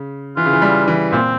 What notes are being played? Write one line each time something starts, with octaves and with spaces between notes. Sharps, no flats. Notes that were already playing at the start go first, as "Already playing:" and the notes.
Already playing: C#3
E3 F4
C#3
E3
G3
E3
A#2 C4